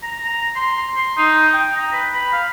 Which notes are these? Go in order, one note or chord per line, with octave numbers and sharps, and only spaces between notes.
A#5
A#5
C6
C6
D#4
G5
A#5
B4
B5
F5